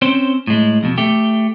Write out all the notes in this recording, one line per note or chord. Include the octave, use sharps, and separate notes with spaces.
C4 C#4 C5
A2 G#3
F2 B2
A3 G4